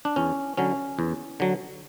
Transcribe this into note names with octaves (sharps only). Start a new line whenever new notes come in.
D4
E2 C#4
D3 F#3 C#4
E2
D3 F#3